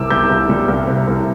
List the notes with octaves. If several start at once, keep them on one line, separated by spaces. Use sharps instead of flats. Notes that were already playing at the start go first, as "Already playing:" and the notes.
Already playing: C2 C3 D6 E6
C2 G6
C2
G3
C2
C3
C2